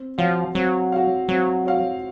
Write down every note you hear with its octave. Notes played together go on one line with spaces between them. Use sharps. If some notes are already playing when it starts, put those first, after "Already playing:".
Already playing: C4
F3 F#4 C#5 F5
F#3 C4
F#4 C#5 F5
F#3 C4
F#4 C#5 F5